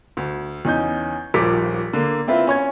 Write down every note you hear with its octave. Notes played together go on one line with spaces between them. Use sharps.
D2
E2 C#4 D#4 G6
D#1 A#1 F3 A#4 D6 B6
D3 A#3
C4 E4 F4 B4 E5
C#4 C#5 G#6